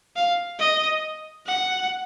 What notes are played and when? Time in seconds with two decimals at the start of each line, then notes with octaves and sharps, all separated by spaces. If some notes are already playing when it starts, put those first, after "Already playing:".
0.16 F5
0.59 D#5
1.46 F#5